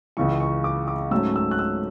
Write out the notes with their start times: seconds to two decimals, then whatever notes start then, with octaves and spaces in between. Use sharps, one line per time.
0.17 C#2 C#3 E3 C#6
0.40 C#6
0.64 D6
0.88 D6
1.11 G#2 F#3 A3 C#4 E6
1.36 E6
1.51 F#6
1.59 E6